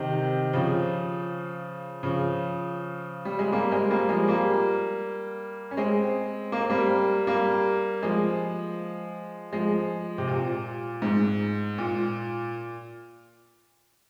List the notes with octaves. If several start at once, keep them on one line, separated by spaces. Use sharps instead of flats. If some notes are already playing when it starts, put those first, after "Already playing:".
Already playing: C3 D#3
C#3 F3
C#3 F3
G3
G#3
G3 A#3
G#3 C4
G3 A#3
F3 G#3
G3 A#3
C#4
G#3 C4
A#3
C4
G3 A#3
G3 A#3
F3 G#3
F3 G#3
C3
A#2
G#2
A#2